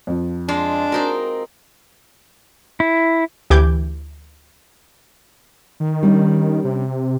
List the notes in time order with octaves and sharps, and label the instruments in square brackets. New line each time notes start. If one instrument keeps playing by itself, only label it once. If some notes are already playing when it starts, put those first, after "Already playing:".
[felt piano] F2 F3
[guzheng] G#3 F4 [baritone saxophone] D4
[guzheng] C4 D#4 A#4 [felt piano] F#4
[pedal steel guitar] E4
[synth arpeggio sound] D2 E3 G4 D6 G6 G#6
[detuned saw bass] D#3
[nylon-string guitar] G3 C#4 D4
[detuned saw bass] C3